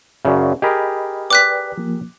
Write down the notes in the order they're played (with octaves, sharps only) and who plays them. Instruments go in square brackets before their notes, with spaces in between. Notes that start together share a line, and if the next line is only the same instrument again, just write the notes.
[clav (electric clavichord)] F#2 C#3 [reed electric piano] D5 E5
[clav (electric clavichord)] G4 G#4 A#4 [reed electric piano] D#5 B5
[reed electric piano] B4 D5 G5 [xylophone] D6 F#6 B6
[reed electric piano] F3 A#3